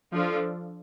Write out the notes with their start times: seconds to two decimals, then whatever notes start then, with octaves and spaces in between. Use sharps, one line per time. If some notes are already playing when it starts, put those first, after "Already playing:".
0.12 F3 D4 F4 A4